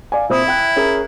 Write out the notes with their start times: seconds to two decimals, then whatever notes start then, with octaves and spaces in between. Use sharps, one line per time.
0.12 D5 F5 G#5
0.29 A#2 C4 E4 D#6
0.47 E5 G5 F#6
0.76 C#4 G#4 A#4